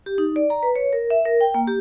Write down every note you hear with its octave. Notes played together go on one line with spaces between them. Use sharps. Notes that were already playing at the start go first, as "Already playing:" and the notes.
G4
D#4
D5
A#5
B4
C#5
A#4
E5
A#4
G5
A#3
G4